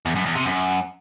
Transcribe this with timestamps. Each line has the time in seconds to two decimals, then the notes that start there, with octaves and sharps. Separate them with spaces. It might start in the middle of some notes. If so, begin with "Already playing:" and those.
0.06 E2
0.16 F#2
0.26 E2
0.36 C3
0.46 F#2